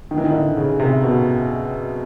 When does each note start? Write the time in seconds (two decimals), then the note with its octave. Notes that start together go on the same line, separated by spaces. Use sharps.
0.11 D#3
0.18 E3
0.25 D#3
0.34 D3
0.57 C#3
0.79 C3
1.03 B2